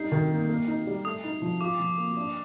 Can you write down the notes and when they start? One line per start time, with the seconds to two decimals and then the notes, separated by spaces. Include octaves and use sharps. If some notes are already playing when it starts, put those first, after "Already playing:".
Already playing: G3 D#4 C7
0.12 D#3
0.31 A#3
0.49 A#3
0.67 D#4
0.87 G3
1.05 A3 D#6
1.24 D#4
1.42 F3
1.61 F4 D6
1.80 F3
1.98 A#3
2.17 D4